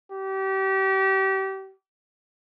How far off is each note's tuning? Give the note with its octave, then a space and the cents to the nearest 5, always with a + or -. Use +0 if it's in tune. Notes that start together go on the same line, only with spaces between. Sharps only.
G4 -30